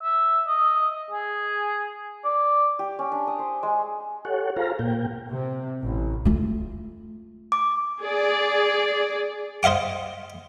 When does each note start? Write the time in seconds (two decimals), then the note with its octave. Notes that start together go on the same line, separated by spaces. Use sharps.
0.03 E5
0.47 D#5
1.11 G#4
2.24 D5
2.79 G4
2.99 C#4
3.12 D4
3.27 D#6
3.39 C5
3.63 G#3
4.25 G4 A4 C#5 F#5
4.56 F4 G#4 A4 C5 F5 A#5
4.79 A#2 A#3 G5
5.31 C3
5.85 A1
6.25 A3 F4
7.52 D6
8.03 G#4 D5
9.63 C5 D#5 F5 F#5 D6